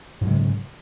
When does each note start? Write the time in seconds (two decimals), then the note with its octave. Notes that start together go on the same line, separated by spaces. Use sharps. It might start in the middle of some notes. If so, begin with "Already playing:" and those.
0.21 G#2
0.24 F#3
0.27 G#3
0.30 C#3